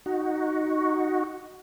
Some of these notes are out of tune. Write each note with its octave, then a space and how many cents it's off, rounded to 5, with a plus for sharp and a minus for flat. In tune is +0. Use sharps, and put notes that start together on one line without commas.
D#4 +0 F#4 +0